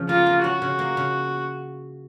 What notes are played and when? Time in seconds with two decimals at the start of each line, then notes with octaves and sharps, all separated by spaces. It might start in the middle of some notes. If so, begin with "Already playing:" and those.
Already playing: C#3 F3 C#4
0.09 A#3 F4
0.26 A#3
0.44 C#4 F#4
0.62 C#3
0.79 A#3
0.97 C#3